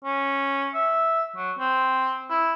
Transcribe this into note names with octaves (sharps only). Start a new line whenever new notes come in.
C#4
E5
F#3
C4
E4